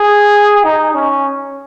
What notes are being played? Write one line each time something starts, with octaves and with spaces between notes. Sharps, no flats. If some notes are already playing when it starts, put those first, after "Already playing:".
Already playing: G#4
D#4
C#4